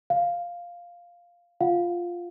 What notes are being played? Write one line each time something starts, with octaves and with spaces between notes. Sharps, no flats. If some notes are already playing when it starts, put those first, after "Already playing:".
F5
F4 F5 F#5